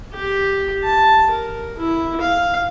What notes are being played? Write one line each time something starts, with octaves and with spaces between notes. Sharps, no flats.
G4
A5
A#4
E4
F5